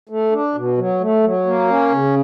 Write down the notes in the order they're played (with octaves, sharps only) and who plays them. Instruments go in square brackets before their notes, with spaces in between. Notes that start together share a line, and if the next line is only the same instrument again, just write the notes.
[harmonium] A3
D4
B2
F#3
A3
F#3
A#3
C#4
C#3